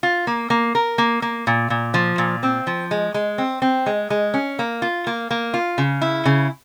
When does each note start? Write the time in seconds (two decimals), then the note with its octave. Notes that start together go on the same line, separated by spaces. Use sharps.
0.03 F4
0.27 A#3
0.50 A#3
0.75 A#4
0.98 A#3
1.22 A#3
1.47 A#2
1.70 A#2
1.94 F3
2.18 A#2
2.43 C4
2.67 F3
2.91 G#3
3.14 G#3
3.38 C4
3.62 C4
3.86 G#3
4.10 G#3
4.34 C#4
4.59 A#3
4.82 F4
5.07 A#3
5.31 A#3
5.54 F4
5.78 C#3
6.02 E4
6.25 C#3